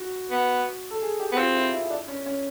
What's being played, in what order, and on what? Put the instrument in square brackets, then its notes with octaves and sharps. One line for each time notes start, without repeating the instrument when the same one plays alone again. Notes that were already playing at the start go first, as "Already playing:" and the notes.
Already playing: [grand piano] F#4
[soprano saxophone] B3
[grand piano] A4
G#4
G4
[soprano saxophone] B3
[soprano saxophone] C4 [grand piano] F4
[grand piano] E4
E4
D4
C#4
C#4